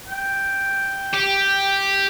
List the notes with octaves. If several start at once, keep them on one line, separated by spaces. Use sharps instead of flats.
G5
G4